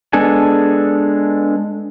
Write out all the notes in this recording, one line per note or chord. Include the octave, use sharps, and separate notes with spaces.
G#3 B3 D4 A4 G#5